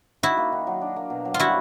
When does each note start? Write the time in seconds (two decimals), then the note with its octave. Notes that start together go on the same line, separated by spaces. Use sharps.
0.23 D#4 E4 F#4
0.37 A#3
0.52 D#3
0.67 F#3
0.81 D4
0.96 A#3
1.10 B2
1.25 F#3
1.34 F4
1.39 G3 E4 F#4